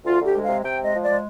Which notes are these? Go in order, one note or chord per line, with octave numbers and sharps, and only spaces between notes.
D2 F4
D2
G4
G#3
C3 F5
C3 G5
G#3 D#5
F3
D5
G#3